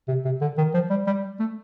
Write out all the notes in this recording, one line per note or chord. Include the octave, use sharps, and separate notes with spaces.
C3
C3
D3
D#3
F3
G3
G3
A3